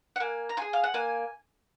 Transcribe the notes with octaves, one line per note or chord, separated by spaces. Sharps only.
F#5
A#3 G#5
A#5
F4 G#4 G#5
F5
F#5
A#3 G#5